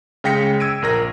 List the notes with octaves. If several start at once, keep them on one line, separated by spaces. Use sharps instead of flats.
C#3 G#3 G5 A#6 B6 C#7
E6 G#6 D7 D#7
A#1 A#4 A#6